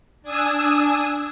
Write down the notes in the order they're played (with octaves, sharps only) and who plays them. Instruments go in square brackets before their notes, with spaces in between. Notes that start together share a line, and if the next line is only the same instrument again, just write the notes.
[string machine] D4 G#5 D#6 E6